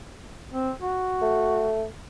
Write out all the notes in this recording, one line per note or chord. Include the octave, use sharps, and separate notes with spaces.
C4
F#4
A3